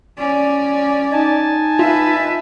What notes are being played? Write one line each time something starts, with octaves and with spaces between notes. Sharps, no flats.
C#4 D5
D#4 G#5 A5
F4 B4 E5